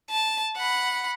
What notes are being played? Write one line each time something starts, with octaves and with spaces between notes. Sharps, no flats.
A5
F#5 B5